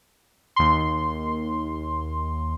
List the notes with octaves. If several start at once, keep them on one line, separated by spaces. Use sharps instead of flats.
D#2 C6